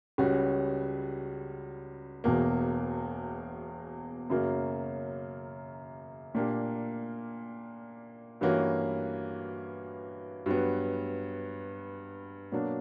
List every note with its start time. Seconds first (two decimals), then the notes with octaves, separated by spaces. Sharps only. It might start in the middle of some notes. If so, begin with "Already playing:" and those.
0.18 C#2 C#3 G3 C#4 F#4
2.24 E1 E2 B2 A#3
4.30 F#2 C#3 F#3 A#3
6.35 A#2 A#3 D4 G4
8.41 G2 E3 A#3 C#4 F#4
10.46 G2 F#3 B3
12.52 B2 F#3 A#3 D4